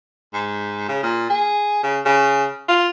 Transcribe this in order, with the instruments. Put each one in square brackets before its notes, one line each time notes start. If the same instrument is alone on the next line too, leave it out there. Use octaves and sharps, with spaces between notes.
[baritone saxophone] G#2
C#3
A#2
G#4
C#3
C#3
F4